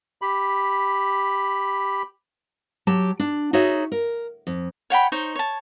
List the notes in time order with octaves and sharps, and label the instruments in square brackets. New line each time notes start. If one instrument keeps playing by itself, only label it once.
[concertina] G4 B5
[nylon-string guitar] F#3 G4 A5
D4
D#4 F#4 G#4 C#5 E5
A#4
F2
[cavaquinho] C#5 F#5 G5 B5
D#4 C5 C#5
C#5 A5